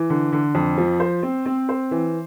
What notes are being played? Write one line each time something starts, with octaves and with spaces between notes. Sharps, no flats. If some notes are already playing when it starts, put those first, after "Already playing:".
Already playing: E3
D3
D3
F2
F3
C5
C4
C4
C5
E3